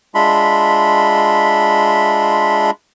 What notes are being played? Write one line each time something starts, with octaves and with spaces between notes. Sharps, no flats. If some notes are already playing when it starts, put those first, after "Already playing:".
G#3 D4 F4 E5 B5 C6